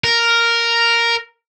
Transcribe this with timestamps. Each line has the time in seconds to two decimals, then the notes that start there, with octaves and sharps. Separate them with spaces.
0.04 A#4